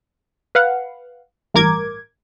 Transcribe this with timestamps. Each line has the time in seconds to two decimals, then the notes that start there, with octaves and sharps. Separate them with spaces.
0.55 B4 F5 F#5
1.54 A1 G2 A#4 D6 G#6